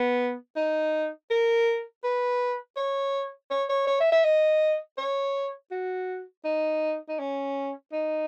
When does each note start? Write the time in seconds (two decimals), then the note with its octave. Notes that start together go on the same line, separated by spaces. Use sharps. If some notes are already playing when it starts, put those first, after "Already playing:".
Already playing: B3
0.56 D#4
1.31 A#4
2.04 B4
2.77 C#5
3.51 C#5
3.69 C#5
3.87 C#5
4.00 E5
4.12 E5
4.24 D#5
4.98 C#5
5.71 F#4
6.45 D#4
7.09 D#4
7.19 C#4
7.93 D#4